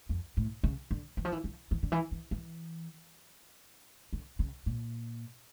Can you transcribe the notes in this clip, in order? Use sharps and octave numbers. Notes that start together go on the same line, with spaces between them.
F2
A2
C#3
D3
E3
F3
E3
F3
E3
D3
E3
E3
E3
D3
C#3
A#2